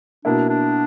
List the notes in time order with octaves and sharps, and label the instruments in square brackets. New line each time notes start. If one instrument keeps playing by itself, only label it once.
[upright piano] B2 A#3 E4 [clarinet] D4
[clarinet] D4